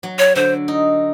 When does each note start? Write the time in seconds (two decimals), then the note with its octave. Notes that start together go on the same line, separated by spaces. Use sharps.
0.03 F#3
0.19 C#5
0.35 D3 C5
0.68 D#4